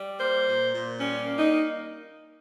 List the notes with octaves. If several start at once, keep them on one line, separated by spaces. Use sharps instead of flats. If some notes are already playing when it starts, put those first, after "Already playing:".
Already playing: G3
A#3 C5
A#2
A#2
G3 C#4
A#3
D#4